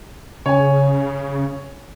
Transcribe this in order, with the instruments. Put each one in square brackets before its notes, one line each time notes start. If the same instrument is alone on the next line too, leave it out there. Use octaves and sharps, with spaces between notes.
[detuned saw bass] C#3 [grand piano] C#5 G#5